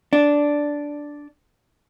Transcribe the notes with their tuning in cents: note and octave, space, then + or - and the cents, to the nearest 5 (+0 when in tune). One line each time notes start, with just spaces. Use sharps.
D4 -5